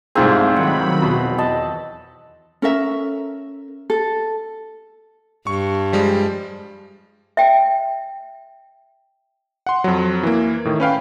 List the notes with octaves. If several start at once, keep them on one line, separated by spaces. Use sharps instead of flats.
C2 G#2 G3 A3 C4 F4 G#4
D#3 F#3 F#5 B5
E2 B2
D#5 A5
C#4 A4 A#4 E5
A4
G2 C#6
F3 G3 G#3
E5 G5
F#5 C6
F2 F#3
E3 A#3
A2 D#3
C#4 B4 F5 G5